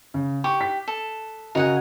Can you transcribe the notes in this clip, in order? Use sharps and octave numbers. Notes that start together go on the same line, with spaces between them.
C#3
G4 C#6
B6
A4
C#3 F#4 A#4 D#5 F#5 G#5